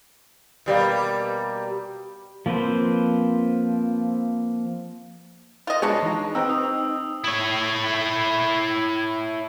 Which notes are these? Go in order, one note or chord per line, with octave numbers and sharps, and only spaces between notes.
B2 G3 A#3
F3 A#3 C4 B4 C5
F4 D#5
G#3 D4 G#4 B4 C#5 A5
E3 D#4 A#5
C4 D#4 B4 G5 E6
D#4 D#6
E4 C#5